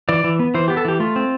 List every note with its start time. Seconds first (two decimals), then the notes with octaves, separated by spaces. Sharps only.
0.09 E3 D5
0.24 E3
0.39 B3
0.54 E3 C5
0.68 B3 G4
0.77 A4
0.85 E3 G4
1.00 A3 F4
1.16 C4